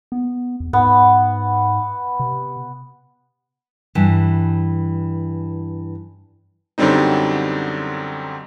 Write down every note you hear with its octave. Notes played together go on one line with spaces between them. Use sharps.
B3
E2
G#2 B3
C3
G2 E3
F#2 D3 F#3 G3 C4 D#4